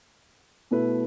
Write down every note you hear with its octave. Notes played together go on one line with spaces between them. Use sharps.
B2 A3 E4 B4